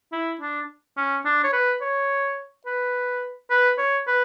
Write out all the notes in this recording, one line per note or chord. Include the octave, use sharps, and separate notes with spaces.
E4
D4
C#4
D4
C#5
B4
C#5
B4
B4
C#5
B4